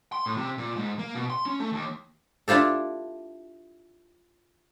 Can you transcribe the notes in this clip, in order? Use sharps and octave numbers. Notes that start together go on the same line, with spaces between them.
C6
A2
C3
A#2
G#2
A#3
B2
C6
C#4
A3
D#2
D4 E4 F4 G4 A4